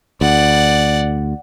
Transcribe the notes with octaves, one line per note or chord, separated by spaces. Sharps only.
D2 D5 F#5